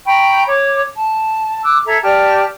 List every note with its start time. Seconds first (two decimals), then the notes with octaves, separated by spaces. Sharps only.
0.07 G5 A#5 B5 C#6
0.47 C#5 D6
0.97 A5
1.63 D6 E6 F#6
1.86 A4 E5 A#5 G#6
2.02 G4 D5 A5 F6